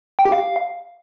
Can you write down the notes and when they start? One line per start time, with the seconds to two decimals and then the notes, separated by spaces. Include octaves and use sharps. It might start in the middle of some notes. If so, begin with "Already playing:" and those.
0.19 G5
0.25 G4
0.32 F5